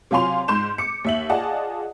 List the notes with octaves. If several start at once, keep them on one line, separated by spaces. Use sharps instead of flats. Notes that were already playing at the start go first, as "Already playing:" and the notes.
C3 F#3 F4 G#5 C6 F7
G#2 C6 G6 E7
D6 C#7
D#2 E5 F#7
F4 G#4 D5 D#5 F#5 A5